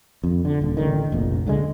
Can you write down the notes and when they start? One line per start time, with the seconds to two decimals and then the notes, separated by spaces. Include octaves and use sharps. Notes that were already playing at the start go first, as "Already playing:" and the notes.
0.24 F2
0.45 D3
0.62 D#1
0.77 A1 D3 D#3
1.12 F1 A#1
1.46 C#2 D3 F3 G#3